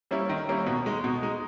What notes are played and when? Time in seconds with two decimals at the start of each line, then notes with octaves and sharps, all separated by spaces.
0.11 G3 A#3 C#4 E4
0.29 D#3
0.48 G3 A#3 C#4 E4
0.66 B2
0.86 G#3 D#4
1.04 B2
1.22 G#3 D#4